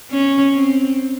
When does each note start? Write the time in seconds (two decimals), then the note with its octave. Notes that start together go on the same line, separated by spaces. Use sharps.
0.11 C#4
0.55 C4